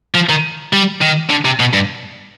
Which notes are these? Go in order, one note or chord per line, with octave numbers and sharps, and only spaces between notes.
F3
D#3
G3
D#3
D3
C3
B2
G2